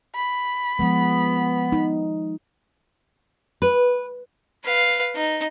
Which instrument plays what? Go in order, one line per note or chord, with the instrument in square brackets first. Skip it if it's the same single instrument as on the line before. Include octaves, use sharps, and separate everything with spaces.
[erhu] B5
[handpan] F3 G#3 [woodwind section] B3
[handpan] D#4
[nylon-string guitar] B4
[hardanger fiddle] B4 F5
D#4